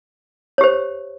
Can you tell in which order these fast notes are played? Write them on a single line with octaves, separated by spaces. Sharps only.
C#5 G4 C5